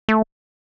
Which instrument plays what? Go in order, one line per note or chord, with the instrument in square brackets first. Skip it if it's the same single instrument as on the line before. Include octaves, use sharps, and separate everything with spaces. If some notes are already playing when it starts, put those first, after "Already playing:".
[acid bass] A3